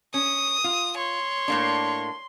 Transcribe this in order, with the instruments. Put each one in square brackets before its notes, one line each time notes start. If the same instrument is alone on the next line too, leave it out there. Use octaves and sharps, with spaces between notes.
[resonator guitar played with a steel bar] C#4 [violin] D#6
[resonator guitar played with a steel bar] F4
[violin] C#5 [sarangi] C6
[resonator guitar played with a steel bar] A2 A#3 D4